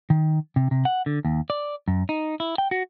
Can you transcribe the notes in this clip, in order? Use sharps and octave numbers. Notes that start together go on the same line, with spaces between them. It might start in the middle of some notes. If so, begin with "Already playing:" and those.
D#3
C3
C3
F#5
D3
D#2
D5
F#2
D#4
E4
G5
F#4